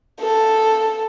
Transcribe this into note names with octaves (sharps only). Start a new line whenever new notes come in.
A4